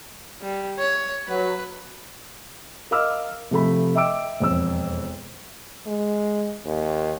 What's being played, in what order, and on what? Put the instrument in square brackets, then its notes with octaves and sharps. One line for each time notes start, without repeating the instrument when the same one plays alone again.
[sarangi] G3
C#5
[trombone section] F#3 [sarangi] B4
[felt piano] A#4 D#5 F5 D6 E6 F6
C3 F3 A3 B5
D#5 E5 G5 D6 E6 D7
E1 F2 E6
[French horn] G#3
D#2